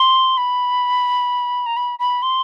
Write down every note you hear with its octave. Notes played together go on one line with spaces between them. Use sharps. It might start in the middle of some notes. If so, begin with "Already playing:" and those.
Already playing: C6
B5
A#5
B5
B5
C6